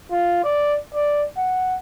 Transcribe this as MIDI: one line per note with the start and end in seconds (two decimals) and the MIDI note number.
0.12 0.44 65
0.44 0.76 74
0.94 1.23 74
1.37 1.78 78